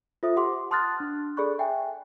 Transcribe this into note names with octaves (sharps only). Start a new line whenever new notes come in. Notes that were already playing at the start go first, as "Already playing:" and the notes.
F4 A4 C5 E5 D#6
G4 F#5 C6 D6
A5 C6 D#6 F6 F#6 A6
D4
G#4 A4 D5 B5 C#6 F#6
E5 G5 G#5